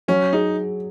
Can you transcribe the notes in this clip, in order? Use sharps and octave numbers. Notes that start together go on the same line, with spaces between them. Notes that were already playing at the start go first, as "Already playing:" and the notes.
F#3 C#4
D#4 G#4